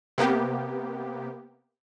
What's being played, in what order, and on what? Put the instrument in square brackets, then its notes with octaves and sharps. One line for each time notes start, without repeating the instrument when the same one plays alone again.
[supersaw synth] C3 A#3 B3 G4